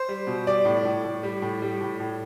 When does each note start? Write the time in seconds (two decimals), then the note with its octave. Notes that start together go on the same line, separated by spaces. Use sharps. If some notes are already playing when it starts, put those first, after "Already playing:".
Already playing: C5
0.09 G3
0.27 B2
0.46 G3 D5
0.65 A2
0.85 A2
1.04 A2
1.23 G3
1.42 A2
1.62 G3
1.81 A2
2.00 A2